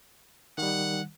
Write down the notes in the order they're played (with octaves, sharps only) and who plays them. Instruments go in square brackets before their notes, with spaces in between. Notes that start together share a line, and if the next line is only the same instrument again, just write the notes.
[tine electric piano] D#3 G3 [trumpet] F#5